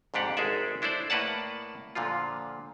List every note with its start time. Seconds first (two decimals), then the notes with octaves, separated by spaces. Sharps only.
0.14 F2 G#2 D4 G4 F#5
0.37 G#1 G#3 G#4 A4 D5 E5
0.82 D4 E4 A4 C5 D5
1.10 A2 A#3 B4 D5 F#5 A5
1.95 A#2 D3 F3 F4